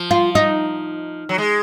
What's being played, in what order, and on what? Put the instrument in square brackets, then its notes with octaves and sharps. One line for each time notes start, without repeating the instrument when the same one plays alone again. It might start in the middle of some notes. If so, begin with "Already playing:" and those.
Already playing: [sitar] F3
[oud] F4
D#4
[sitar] F#3
G#3